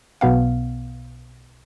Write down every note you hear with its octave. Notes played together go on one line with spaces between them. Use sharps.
B1 B2 B3 F5